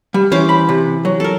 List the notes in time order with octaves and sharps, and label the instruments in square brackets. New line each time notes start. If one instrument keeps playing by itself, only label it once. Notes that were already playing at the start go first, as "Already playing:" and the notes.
[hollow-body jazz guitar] G3
[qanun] E3 C5 D6 [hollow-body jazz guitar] C#4
[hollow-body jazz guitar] B5
C3
F#3
[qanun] A4 A#4